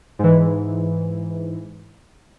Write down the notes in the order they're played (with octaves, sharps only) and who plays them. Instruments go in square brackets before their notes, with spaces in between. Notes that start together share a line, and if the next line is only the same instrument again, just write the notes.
[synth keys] G#2 E3